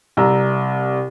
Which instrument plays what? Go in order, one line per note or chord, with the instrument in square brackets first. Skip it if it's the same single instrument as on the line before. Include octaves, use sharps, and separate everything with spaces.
[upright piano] C2 A#5 E6